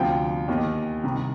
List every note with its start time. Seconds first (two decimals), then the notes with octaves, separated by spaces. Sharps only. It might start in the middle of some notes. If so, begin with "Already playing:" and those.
Already playing: D2 C3 F3 G5
0.48 D#2 D#3
1.03 C2 C3 D#3